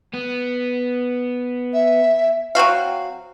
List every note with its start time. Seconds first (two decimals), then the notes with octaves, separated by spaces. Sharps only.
0.14 B3
1.74 E5
2.55 F#3 C4 F#4 F5